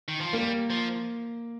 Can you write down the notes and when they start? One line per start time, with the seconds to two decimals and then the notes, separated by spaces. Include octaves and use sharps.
0.08 D#3
0.21 F3
0.33 G3 A#3
0.70 F3